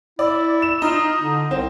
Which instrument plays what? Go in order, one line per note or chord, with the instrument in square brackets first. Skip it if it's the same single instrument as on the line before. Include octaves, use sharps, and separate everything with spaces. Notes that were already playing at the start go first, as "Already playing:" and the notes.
[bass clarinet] E4 [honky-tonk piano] D5
[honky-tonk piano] E7
[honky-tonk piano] D#4 [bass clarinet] F4
[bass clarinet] D3
[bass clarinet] C2 [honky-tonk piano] C4